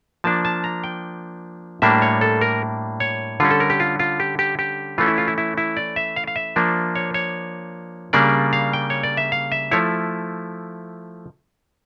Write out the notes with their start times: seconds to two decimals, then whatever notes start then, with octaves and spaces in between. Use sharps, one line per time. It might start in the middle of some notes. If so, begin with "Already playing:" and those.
0.24 F3 A#3 D4 A5
0.45 A5
0.64 A#5
0.84 G5
1.82 A2 G3 A#3 D4 E5
2.02 C#5
2.21 A4
2.41 A#4
3.00 C#5
3.40 D3 G3 C#4 F4
3.51 A4
3.60 A#4
3.70 G4
3.80 F4
3.99 F4
4.20 G4
4.39 G4
4.59 G4
4.98 E3 A3 C#4 F4
5.07 E4
5.18 F4
5.28 E4
5.38 E4
5.58 E4
5.77 D5
5.96 E5
6.16 F5
6.27 F5
6.36 E5
6.56 F3 A#3 D4
6.96 C#5
7.14 C#5
8.13 C#3 G3 A#3 D4 D5
8.53 F5
8.73 G5
8.90 C#5
9.03 D5
9.17 E5
9.32 F5
9.52 E5
9.71 F3 A3 E4 C#5